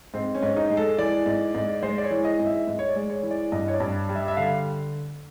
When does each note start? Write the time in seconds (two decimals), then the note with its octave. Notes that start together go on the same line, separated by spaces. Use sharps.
0.14 G#2 C4
0.35 C#4
0.43 G#2
0.56 D#4
0.70 G#3
0.77 A4
0.98 E3 D5
1.26 G#2
1.55 G#2
1.83 G#3 C5
1.98 D5
2.04 C#5
2.11 E3
2.25 D#5
2.40 G#2
2.46 E5
2.67 G#2
2.79 C#5
2.89 D5
2.96 G#3
3.10 C#5
3.23 E3
3.31 D5
3.52 G2 D#5
3.68 C#5
3.74 D5
3.80 G2
4.09 G3
4.15 E5
4.28 E5
4.36 D3 F5